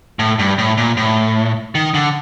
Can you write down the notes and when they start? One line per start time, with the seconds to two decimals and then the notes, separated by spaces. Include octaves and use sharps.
0.19 A2
0.39 G2
0.58 A2
0.78 A#2
0.97 A2
1.75 D#3
1.94 D3